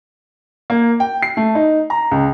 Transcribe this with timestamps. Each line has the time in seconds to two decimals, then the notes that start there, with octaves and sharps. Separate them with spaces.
0.70 A#3
1.00 G5
1.23 C7
1.37 A3
1.55 D#4
1.90 A#5
2.11 C#2